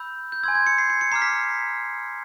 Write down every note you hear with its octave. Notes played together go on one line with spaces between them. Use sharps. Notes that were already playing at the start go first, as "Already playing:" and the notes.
Already playing: B5 E6 G6
G6
G#5 C6 E6 G#6
G#6
C#7
C7
C#7
C#7
A#5 D6 F6 C7
B6